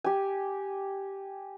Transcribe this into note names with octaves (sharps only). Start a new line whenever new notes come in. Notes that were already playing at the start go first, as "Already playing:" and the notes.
G4 G#5